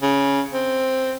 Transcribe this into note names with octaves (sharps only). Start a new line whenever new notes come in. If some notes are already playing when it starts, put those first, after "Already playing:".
C#3
C4